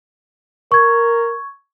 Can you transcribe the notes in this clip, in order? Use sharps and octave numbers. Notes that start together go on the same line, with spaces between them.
A#4 C#6 G#6